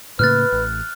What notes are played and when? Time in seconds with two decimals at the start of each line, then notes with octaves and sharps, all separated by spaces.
0.19 A2 C#3 A#3 B4 F6 F#6 A6
0.52 A1